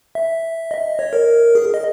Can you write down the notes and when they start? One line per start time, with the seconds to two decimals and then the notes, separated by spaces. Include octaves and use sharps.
0.15 E5
0.71 D#5
0.99 C#5
1.13 A#4
1.55 G#4
1.74 D#5